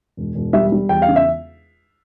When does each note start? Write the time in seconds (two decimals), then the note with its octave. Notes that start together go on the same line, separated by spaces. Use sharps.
0.17 E1
0.35 E1
0.53 G3 E5
0.72 G3
0.89 E2 G5
1.02 F5
1.08 C#3
1.16 E5